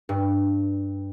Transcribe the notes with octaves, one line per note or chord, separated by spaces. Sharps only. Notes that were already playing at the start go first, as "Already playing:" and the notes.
G2